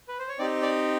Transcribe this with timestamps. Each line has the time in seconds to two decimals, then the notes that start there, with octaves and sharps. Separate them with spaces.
0.08 B4
0.19 C5
0.29 C#5
0.39 C4 D#4 G4 D5
0.62 D5